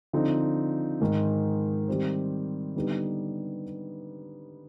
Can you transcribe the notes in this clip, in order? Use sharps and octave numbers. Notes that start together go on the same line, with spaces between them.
D3 F3 C4 D#4
G#2 D#3 G#3
D#3 G3 C4 G4 C5
D3 G3 B3 D#4 B4